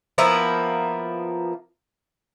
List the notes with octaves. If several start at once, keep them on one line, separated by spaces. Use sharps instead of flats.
F3 A#3 B3 E4